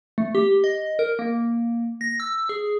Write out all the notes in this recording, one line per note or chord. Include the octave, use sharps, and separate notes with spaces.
A3
G4
D#5
A#4
A#3
A#6
E6
G#4